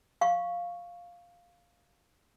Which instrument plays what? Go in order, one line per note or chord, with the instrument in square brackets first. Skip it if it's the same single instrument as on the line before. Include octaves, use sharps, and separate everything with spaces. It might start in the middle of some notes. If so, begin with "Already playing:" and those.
[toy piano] F5 C#6